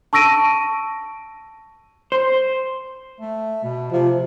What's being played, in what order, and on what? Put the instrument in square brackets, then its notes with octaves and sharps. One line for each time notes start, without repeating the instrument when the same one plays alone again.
[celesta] A5 C#6 E6 A#6 D7 D#7
[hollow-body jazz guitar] C5
[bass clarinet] A3
B2
[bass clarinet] C3 [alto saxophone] F3